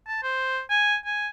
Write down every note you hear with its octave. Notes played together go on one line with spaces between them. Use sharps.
A5
C5
G#5
G#5